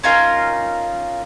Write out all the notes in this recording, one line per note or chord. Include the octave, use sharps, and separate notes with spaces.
C#4 D#4 F4 A#4